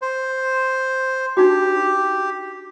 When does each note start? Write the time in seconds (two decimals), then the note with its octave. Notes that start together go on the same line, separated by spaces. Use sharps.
0.02 C5
1.37 D4 D#4 F#4 G4